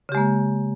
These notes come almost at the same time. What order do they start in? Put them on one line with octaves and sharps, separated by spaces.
C#3 G4 G#3 A#3